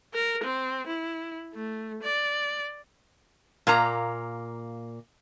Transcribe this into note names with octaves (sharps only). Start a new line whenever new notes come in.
A#4
C4
E4
A3
D5
A#2 A#3 A#5